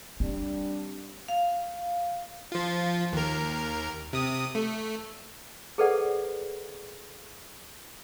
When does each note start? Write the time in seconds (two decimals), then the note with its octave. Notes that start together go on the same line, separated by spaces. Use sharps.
0.20 G3 C4 D4
1.28 F5
2.52 F3 F4
3.13 D#2 A#4
4.13 C3 D#6
4.55 A3
5.78 G#4 A4 B4 C5 D5 F#5